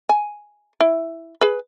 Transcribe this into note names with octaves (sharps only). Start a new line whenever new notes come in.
G#5
E4
G#4 B4